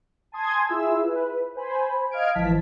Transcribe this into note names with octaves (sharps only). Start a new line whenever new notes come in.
G#5 A5 C6 D#6 G#6
E4 F4 G#4 E5 E6
B4
C5 G#5 B5
D#5 F5 F6 G#6 D7
G#1 E3 F3 A5 B6